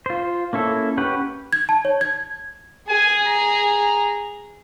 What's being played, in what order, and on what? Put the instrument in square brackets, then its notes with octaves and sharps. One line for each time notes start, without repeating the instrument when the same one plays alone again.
[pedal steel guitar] F4 C5
A#3 C#4 E4 A4
C#4 G4 B4 F#5
[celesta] G#6
A5
C#5
G#6
[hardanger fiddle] G#4 [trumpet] G#5
[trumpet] A#5